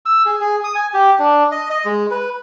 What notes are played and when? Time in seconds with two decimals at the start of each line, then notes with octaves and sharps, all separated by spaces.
0.06 E6
0.26 G#4
0.41 G#4
0.64 D#6
0.75 G#5
0.94 G4
1.19 D4
1.52 D#5
1.70 D#5
1.85 G#3
2.11 B4